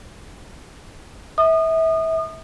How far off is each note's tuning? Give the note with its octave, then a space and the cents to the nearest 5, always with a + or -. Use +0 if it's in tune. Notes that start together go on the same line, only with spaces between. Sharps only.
E5 -30 D#6 -30